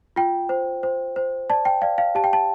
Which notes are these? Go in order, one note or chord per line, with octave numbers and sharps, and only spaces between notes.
F4 G5
C5
C5
C5
D5 A5
G5
D5 F5
F5
G4 A5
G5
A5